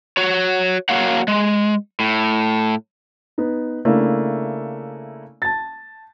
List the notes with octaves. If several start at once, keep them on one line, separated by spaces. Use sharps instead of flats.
F#4 C#5
F#3 A#3 F#4 C#5 F5 F#5
G#3
A2
B3 D#4
C#3 A3 A#3 D4 E4
A5 A6